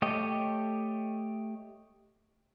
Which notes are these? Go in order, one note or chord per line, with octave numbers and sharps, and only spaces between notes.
A3 G4 C#5 D#5